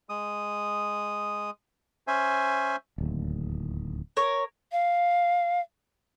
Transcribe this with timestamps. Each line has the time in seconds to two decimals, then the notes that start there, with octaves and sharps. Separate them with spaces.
0.09 G#3 D#6
2.07 C#4 C5 E5 G#5
2.98 D1 D#2
4.17 A#4 C#5
4.72 F5